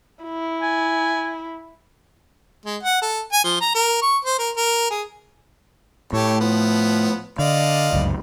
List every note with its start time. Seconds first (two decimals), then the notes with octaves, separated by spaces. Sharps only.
0.24 E4
0.62 G#5
2.65 G#3
2.83 F#5
3.02 A4
3.32 G#5
3.44 F3
3.61 A#5
3.75 A#4
4.02 C#6
4.25 C5
4.39 A#4
4.57 A#4
4.90 G#4
6.13 A2 G4 A4 C#5
6.40 F3 B3
7.39 D3 D5 D#5 F5
7.93 G1 C#2 F#2